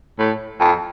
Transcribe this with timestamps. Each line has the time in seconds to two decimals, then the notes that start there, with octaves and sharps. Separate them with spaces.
0.19 A2
0.60 F2